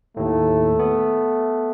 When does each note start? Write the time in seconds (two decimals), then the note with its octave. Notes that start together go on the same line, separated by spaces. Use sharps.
0.17 D#2 A2 A3
0.79 B3